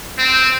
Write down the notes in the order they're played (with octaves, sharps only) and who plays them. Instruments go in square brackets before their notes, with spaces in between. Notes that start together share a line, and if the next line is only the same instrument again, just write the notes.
[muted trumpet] C4